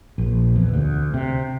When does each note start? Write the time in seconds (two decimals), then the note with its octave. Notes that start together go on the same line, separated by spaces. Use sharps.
0.18 A#1
0.56 E2
0.73 D2
1.14 C3